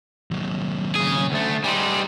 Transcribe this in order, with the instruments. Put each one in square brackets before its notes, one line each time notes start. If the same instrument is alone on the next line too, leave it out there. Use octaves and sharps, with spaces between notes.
[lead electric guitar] D#2 F#3
[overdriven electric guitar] C#3 G#4
D2 A3
[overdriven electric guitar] G3 D#4 [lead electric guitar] G#5 C6